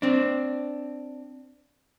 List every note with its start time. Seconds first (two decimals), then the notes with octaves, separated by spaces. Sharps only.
0.02 C4 D4